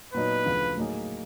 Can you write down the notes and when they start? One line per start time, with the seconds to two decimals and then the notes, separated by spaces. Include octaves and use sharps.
0.14 A#2 F#3 B3 D#4 B4
0.45 D2 C#3 F3 A3
0.77 A2 F#3 A#3 D#4 G#4